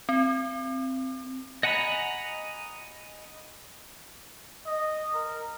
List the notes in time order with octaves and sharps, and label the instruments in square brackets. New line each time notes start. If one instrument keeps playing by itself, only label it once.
[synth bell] C4
[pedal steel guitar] D#5 F#5 G#5 A#5 B5
[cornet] D#5
A#4